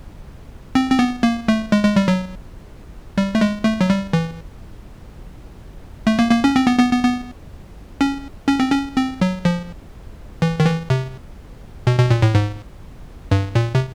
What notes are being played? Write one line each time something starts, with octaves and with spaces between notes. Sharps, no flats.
C4
C4
B3
A#3
A3
G#3
G#3
G3
F#3
G3
A3
G#3
A3
F#3
G3
E3
A3
A#3
A#3
C#4
C4
B3
B3
B3
B3
C#4
C#4
C4
C#4
C4
F#3
F3
E3
D#3
E3
C3
B2
B2
A#2
A2
G#2
G2
A#2
C3